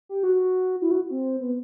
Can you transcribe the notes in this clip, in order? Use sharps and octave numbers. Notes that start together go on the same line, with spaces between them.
G4
F#4
E4
F#4
C4
B3